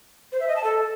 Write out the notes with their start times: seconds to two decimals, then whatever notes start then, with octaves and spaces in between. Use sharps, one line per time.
0.32 C5
0.40 E5
0.48 D#5
0.56 A5
0.64 A4